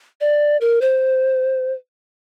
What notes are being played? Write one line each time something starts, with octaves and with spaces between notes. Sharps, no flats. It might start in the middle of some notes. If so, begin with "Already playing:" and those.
D5
A#4
C5